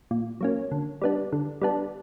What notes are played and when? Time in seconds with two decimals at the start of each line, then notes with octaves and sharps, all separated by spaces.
0.11 A#2
0.41 F#3 A#3 C#4
0.71 D3
1.02 G3 B3 D4
1.32 D3
1.62 G3 B3 D4